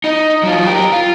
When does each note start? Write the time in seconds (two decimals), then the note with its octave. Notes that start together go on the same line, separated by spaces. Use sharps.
0.04 D#4
0.43 F#3 F4
0.66 G4 A#4
0.92 F4